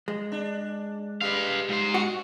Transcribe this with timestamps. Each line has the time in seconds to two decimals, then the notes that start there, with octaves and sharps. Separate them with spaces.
0.08 G#3
0.32 D4
1.21 G3 G#3 B4 F5
1.69 G#2 C5
1.94 F#4